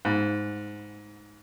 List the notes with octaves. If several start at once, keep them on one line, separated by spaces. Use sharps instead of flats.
G#2